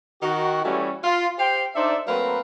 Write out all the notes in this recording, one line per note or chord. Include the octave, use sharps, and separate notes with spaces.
D#3 F#4
E3 G3 A3 C#4 E4 F#4
F4
G4 C5 F5 G5
D4 D#4 A4 C5 D5 E5
F#3 A3 A#3 C4 B4